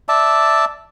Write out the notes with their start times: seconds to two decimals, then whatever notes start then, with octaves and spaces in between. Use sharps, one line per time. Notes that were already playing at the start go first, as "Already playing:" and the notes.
0.09 D5 E5 A5